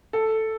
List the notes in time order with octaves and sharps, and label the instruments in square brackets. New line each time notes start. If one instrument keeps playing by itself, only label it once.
[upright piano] A4